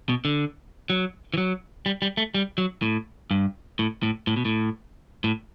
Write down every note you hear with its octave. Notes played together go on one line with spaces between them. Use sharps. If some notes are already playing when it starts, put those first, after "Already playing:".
B2
D3
F#3
E3
F#3
G3
G3
A3
G3
F#3
A2
G2
A2
A2
A2
B2
A2
A2